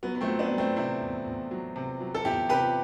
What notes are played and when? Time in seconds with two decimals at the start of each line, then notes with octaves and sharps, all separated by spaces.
0.03 F#3 B3
0.15 B3
0.21 A3 C4
0.27 F#3
0.39 B3 D4
0.52 F#3
0.58 A3 C4
0.76 C3 C4 E4
1.01 E2
1.26 E2
1.51 F#3
1.76 C3
2.00 F#3
2.15 A4
2.25 E2 E4 G4
2.49 C3 G4 B4